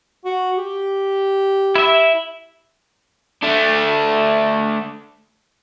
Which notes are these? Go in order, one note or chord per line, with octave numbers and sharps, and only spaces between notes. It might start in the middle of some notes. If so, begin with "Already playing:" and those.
F#4
G4
E4 E5
A3 D4